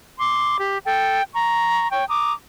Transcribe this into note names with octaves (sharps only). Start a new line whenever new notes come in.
C6 D6
G4
A4 G5
A#5 C#6
C#5 G5 C#6
A#5 D6 D#6